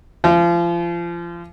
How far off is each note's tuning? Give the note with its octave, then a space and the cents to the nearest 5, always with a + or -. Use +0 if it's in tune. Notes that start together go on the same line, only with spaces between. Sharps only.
F3 -30 F4 -30